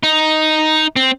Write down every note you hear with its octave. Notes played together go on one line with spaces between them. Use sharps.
D#4
C4